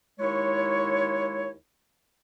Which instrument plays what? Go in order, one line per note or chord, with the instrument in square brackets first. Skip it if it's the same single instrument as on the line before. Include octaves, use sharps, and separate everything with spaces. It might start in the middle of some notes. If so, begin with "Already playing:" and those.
[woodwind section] D#2 G#3 E4 C#5